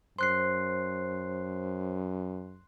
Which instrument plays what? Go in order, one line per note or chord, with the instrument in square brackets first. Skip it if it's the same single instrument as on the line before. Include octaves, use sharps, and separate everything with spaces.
[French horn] F#2 [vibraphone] C5 [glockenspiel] C6 F#6 C7